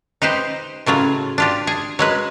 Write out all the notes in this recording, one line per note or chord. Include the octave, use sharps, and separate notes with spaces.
D#4 G4 B4 C5
A2 C#3 F#3 F4
D4 F4 G4
G#4
F#3 G#3 B4